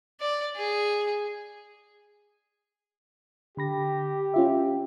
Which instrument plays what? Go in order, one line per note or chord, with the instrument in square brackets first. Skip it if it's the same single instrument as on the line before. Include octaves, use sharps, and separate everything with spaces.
[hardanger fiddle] D5
G#4
[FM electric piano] D3 B5 A#6 [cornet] G4
[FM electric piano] C#4 F4 E5